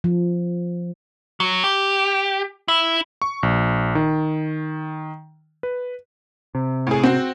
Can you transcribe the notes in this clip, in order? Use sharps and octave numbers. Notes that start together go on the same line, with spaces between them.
F3
F#3
G4
E4
C#6
A#1
D#3
B4
C3
A2 G#4
C4 F#4